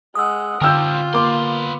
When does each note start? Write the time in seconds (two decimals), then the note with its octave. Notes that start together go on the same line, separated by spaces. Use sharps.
0.15 G#3 F#5 D#6 E6
0.61 D3 C4 F4 A#4 G5 E6 G6
1.13 A#3 B3 C6 D6